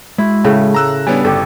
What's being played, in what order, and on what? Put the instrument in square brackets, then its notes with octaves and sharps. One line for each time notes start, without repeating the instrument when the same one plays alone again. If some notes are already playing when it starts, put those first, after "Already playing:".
[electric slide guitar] G#3 F#4 [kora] E4
[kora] A2 C#3 A3
[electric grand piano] A#5 E6 F#6
[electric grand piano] G3 B3 D4 [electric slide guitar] C#5 G5 G#5
[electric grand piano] G1 [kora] G4 A4 [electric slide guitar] D5